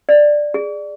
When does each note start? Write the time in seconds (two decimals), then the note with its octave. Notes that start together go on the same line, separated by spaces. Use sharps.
0.09 D5
0.54 G#4